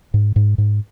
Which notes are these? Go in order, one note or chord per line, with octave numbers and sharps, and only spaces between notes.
G#2
G#2
G#2